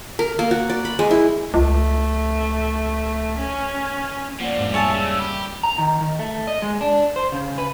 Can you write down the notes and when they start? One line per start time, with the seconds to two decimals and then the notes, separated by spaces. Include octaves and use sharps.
0.19 A#4
0.39 A#3
0.51 F#4
0.70 D5
0.85 B5
0.99 G#3
1.11 E4
1.54 C#2 A3
3.38 C#4
4.40 G2 F3 A#3 D5 F#5
4.58 E2 G#2 G#3
4.74 G3 C#5 E5 G#5 A5
4.94 C#3 E6
5.19 G4 B5
5.63 A#5
5.78 D#3
6.01 D#3
6.19 A3
6.47 D#5
6.62 G#3
6.81 D4
7.16 C5
7.32 C#3
7.58 B4